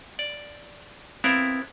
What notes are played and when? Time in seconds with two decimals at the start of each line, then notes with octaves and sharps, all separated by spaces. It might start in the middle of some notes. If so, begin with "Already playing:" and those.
0.19 D5
1.24 B3 C4 E4 A#4 F5 B5